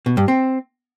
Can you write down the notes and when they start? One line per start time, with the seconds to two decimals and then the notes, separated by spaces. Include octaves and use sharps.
0.06 B2
0.17 G2
0.28 C4